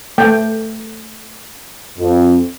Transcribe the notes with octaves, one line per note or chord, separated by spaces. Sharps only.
A3 G5
F2